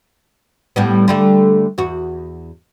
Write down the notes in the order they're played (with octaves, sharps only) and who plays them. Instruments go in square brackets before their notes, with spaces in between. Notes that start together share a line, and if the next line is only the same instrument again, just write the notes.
[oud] A2 G3 B3
D3 G3 A3
E2 F#4